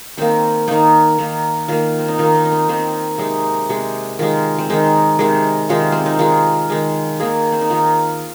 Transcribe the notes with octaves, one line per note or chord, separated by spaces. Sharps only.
D#3 A#3 C4
D#3 A#3 D#4
D#3 A#3
D#3 A#3 F4
C4
D#4
D#3 A#3 F4
D#4
D#4
C4
D#3 A#3 C4
C3 G#3 D#4
C3 G#3
D#3 G#3 F4
C4
D#3 G#3 D#4
C3 D#3 G#3
C3 D#3 G#3 F4
C4
D#4
D#3 G#3 F4
D#3 G#3
D#3 A#3 G#4
C4
D#4
D#3 A#3 F4